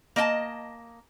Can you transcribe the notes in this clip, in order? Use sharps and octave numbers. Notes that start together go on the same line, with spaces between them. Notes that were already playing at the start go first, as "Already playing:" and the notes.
A#3 D#5 G5 A5